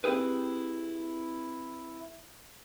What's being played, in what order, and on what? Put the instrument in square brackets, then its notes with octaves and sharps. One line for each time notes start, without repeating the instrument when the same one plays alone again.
[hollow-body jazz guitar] C4 E4 G4 G#4 B4